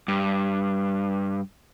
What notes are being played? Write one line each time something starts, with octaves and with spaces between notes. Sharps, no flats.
G2